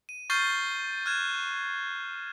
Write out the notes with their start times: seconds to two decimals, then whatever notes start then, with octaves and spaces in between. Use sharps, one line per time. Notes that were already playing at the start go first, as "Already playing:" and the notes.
0.09 D#7
0.30 C#6 F6 G6 A6 C7 G7
1.06 F6 F#6 G#6 E7